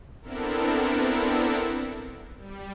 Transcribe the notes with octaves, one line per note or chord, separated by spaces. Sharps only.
B3 C4 D4 E4 A4 A#4
G3